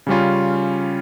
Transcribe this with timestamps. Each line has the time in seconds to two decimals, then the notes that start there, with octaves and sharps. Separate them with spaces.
0.07 C#3 G3 C#4 F4